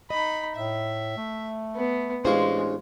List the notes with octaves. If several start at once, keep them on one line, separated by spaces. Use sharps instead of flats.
D#4 D#5 B5
A2 E5
A3
B3
A1 G#3 D4 F4 G#4 C5 C#6